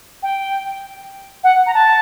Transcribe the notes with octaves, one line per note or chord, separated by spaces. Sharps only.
G5
F#5
A#5
A5